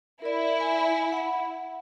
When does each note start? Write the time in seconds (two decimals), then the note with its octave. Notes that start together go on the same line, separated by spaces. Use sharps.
0.22 E4 A#4 D5
0.60 G#5
1.12 F#5 B5